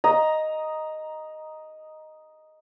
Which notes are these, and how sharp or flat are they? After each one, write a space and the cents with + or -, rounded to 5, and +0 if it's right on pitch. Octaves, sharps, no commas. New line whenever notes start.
D#5 +0 A#5 +10